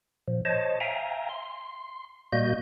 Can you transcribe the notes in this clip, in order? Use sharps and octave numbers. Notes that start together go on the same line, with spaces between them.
A#2 F3
C5 C#5 D#5 A5
E5 F5 G5 G#5 A#5
C6
A#2 G3 A#3 F#4 D#5 G6